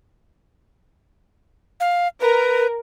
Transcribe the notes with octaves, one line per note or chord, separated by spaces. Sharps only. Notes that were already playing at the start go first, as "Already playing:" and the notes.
F5
A#4 B4